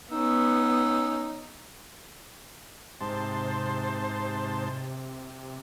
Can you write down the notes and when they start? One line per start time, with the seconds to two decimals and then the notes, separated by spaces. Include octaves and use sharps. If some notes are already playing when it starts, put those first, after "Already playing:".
0.12 B3 C#4 D#4 E6
3.01 G#2 C3 C5 A5 C6